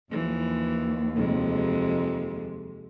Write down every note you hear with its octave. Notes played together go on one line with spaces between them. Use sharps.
D#2 E3 F3
F2 C3 G#3